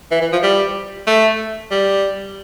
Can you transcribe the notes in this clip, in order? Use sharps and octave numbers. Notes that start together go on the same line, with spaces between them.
E3
E3
F3
G3
A3
G3